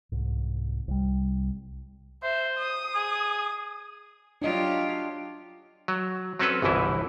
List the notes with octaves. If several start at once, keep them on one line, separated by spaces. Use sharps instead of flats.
C2 G#2
C2 G3
C5 E5
D#6
G#4
F#3 D4 F4 G4 D#5
F#3
F#3 C4 C#4 A4 B4
G1 C2 B2 E3 E4